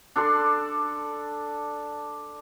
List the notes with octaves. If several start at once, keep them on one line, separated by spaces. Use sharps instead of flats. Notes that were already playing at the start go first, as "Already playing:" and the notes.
D4 A4 D5 C6